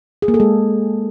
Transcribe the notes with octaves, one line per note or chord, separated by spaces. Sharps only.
G#4
A#3
A4
G#3